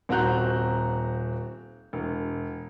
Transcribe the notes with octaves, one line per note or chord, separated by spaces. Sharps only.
D#1 C4 F#4 A#5 F#6 G6
E1